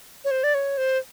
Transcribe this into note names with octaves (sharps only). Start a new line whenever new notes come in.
C#5
C5
D5
C#5
C5